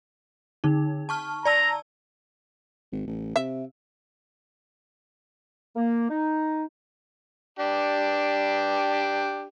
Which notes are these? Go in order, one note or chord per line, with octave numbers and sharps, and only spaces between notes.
D3 D#4
A5 C#6 F6
D5 A5 A#5 E6
G#1
A1
C3 E5
A#3
D#4
D4 G4